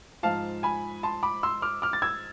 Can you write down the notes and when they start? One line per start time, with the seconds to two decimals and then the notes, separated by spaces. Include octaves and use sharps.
0.23 G#2 F3 F5 A5
0.63 G#5 B5
1.03 A5 C6
1.23 B5 D6
1.43 C6 E6
1.62 D6 F6
1.82 D6 F6
1.93 A6
2.02 E6 G#6